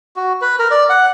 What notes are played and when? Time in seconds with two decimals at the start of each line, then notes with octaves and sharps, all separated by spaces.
0.16 F#4
0.41 B4
0.59 A#4
0.71 D5
0.90 F#5